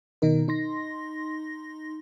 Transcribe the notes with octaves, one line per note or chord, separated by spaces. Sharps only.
B2 D#3 D#4 A#4
D#4 C6 A#6